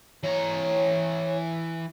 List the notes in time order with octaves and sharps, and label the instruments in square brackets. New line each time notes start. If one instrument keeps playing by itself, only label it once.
[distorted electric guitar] E3 A#5 [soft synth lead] C#5